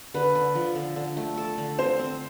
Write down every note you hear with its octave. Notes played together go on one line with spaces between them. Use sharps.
D3 B4
D3
F3
D3
D3
A3
A4
D3
C4 C5
C4